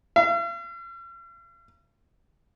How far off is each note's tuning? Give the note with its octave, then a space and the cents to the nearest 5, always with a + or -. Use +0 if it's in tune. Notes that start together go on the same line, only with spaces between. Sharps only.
F5 -45